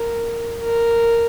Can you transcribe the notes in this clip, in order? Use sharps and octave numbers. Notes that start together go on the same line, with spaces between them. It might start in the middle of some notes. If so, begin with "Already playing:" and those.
Already playing: A#4
A#4